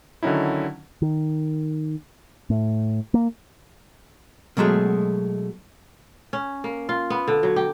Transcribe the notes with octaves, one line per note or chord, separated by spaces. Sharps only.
D3 D#3 F#3 C#4 D#4 E4
D#3
A2
A#3
B2 F#3 G#3 A3
C#4
A#3
F4
B3
D3
F#3
G4